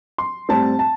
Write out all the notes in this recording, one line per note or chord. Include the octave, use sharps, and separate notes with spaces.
C6
A2 G3 C4 A5
A5